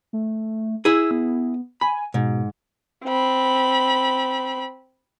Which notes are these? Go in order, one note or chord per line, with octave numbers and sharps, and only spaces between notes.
A3
E4 G#4 E6
B3
G#5 B5
G#2 B2
C4 B5